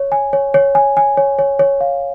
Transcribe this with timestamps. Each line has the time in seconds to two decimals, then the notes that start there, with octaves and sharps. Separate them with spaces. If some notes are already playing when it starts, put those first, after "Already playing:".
Already playing: C#5
0.12 G#5
0.33 C#5
0.54 C#5
0.75 G#5
0.97 G#5
1.17 C#5
1.39 C#5
1.59 C#5
1.81 F5